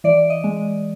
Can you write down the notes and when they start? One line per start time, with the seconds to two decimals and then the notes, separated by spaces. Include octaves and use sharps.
0.04 E3 D5
0.30 D#5
0.44 G#3